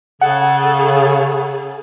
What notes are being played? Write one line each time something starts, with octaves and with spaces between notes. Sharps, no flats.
C#3 G#4 A4 F#5